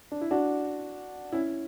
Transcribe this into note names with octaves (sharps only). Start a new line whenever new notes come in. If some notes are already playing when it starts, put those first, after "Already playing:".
D4
E4
D4 F#4
C#4 E4